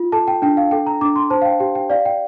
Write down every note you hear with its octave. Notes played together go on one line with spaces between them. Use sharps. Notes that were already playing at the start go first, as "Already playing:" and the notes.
Already playing: F4
A4 A5
G5
D4 G5
F5
A4 G5
A#5
D4 D6
C6
C5 A5
F5
G5
G4 G5
G5
D5 F5
G5